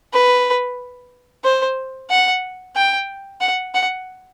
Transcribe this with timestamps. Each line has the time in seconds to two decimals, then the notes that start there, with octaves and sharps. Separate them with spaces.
0.13 B4
1.44 C5
2.10 F#5
2.76 G5
3.41 F#5
3.74 F#5